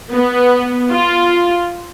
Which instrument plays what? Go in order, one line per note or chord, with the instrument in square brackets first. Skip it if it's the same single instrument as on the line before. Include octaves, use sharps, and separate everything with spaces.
[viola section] B3
F4